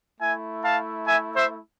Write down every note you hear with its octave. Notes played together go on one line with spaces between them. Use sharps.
A3 E4 E5 G#5
F5 A5
E5 G#5
C5 E5